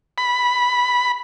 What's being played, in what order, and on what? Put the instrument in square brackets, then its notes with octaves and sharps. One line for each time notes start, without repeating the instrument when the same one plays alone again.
[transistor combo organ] B5